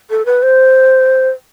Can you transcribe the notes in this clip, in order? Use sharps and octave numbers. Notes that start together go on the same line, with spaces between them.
A4
B4
C5